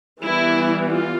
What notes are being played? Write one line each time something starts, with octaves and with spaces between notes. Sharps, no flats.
E3 G3 B3 E4
F4